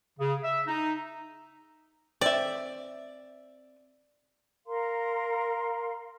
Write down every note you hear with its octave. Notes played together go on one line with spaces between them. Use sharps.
C#3
E5
D#4
C4 D5 E5
A#4 F5 A#5 C6